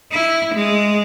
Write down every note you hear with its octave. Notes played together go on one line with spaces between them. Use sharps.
E4
G#3